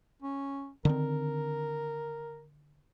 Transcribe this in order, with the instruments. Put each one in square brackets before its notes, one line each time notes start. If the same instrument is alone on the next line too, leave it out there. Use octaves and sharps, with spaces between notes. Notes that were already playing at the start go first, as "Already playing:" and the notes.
[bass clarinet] C#4
[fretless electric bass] D3 D#3 C4 [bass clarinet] A#4